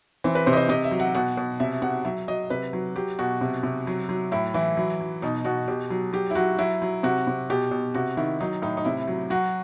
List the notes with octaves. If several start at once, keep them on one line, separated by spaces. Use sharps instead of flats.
E3 C4
B4
C3 C5
D#5
C5
C3 D#5
E5
F#3
F#5
B2 F#5
B2
C3 E5
C3 F#5
F#3 E5
F#3 D#5
C3 B4
F#3
F#3 G4
B2 F#4
C3
C3
F#3
F#3
A2 E4
E3 E4
F#3
F#3
B2 D#4
B2 F#4
B2 G4
F#3
F#3 G4
E4
F#3 F#4
F#3 E4
F#3
C3 F#4
C3
B2 G4
B2
C3 F#4
D#3 E4
F#3 D#4
A2 D#4
D#4
C3 E4
F#3
F#3 F#4